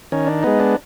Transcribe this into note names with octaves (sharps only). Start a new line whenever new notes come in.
D#3 C#4
D4
G#3 B3 D#4
D4